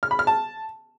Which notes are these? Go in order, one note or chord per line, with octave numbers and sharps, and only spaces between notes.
F6
B5
F6
A5